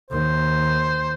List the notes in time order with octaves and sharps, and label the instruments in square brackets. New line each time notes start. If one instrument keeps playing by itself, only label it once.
[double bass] D#2 D#3 [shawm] C5